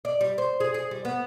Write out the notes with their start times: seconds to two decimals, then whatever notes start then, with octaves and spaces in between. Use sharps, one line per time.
0.05 D5
0.21 G3
0.38 C5
0.60 G#4
0.74 G#4
0.91 G3
1.05 B3